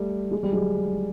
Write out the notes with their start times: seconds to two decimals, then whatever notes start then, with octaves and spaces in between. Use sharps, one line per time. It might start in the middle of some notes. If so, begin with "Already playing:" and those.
Already playing: G3 A3
0.31 G#3
0.43 G3
0.53 F#3 G#3